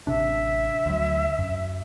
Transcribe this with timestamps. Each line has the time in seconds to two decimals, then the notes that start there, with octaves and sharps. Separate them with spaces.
0.07 A1 C3 D4 E5
0.86 D2 F#3
1.39 F#2